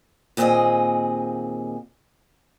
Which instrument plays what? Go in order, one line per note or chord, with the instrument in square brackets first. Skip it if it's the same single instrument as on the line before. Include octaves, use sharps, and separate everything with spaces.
[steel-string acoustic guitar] D#2 A#2 C4 D#4 G#4 D#5